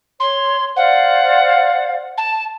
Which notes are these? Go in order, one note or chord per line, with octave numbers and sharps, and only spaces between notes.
C#5 C6
C5 D5 F5 F#5
A5